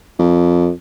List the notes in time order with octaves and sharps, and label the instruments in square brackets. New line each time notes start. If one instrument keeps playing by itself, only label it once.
[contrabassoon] F2